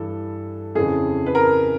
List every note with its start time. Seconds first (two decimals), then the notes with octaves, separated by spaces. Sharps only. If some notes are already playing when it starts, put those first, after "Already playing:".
Already playing: G2 E3 A4
0.75 F2 C#3 E3 G#4
1.26 B4
1.35 A#4